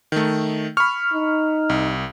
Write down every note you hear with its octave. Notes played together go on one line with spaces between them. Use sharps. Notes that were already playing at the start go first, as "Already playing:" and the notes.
D#3 A3
B5 C#6 F6
D#4
C2